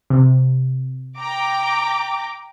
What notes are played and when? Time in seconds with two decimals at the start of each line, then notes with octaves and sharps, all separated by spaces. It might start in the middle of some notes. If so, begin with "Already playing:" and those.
0.10 C3
1.17 G5 A#5 D6